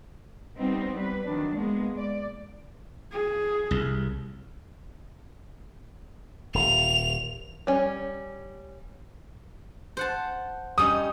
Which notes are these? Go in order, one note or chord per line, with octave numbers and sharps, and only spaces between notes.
G3 B3 C4 D#4
G3 B4
D#3 F#3 D4
G#3 A#3 B3
D5
G#4
C2
D#1 F7
G3 C#4
C5 F#5 A5
G3 C#4 D#4 D#6